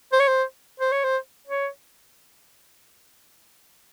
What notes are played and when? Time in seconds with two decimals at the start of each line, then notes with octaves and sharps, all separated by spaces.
0.13 C5
0.20 C#5
0.28 C5
0.80 C5
0.92 C#5
1.04 C5
1.47 C#5